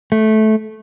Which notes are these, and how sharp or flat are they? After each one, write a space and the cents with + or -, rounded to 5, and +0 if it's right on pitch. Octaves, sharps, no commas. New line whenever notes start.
A3 -15